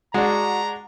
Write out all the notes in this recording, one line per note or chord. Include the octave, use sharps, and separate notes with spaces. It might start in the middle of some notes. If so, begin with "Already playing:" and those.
G#3 D4 F#4 A#5